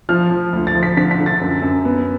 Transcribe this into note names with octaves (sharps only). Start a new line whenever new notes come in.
F3 F6
F3
D2
A6
F3
B6
D3 B6
B6
D3
A6
F#2
F#2
B3